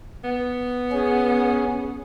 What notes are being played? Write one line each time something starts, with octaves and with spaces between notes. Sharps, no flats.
B3
C#4 G#4